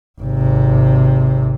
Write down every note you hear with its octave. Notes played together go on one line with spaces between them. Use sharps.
G#1 C3